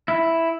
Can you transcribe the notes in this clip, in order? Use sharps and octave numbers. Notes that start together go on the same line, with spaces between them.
E4